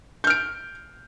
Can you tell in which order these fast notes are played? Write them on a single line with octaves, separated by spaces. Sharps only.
G6 F6 D7